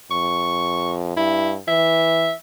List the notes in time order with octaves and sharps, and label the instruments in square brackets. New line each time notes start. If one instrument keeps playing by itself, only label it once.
[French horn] F2 [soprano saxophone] C#6
[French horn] G2 [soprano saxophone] E4
[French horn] E3 [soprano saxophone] E5